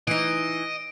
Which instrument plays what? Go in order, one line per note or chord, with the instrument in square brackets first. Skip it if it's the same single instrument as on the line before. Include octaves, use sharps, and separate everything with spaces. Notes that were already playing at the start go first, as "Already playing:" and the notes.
[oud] E3 D#4 [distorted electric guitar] D#5 [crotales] D7